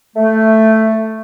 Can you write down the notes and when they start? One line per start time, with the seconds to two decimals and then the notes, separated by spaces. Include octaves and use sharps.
0.16 A3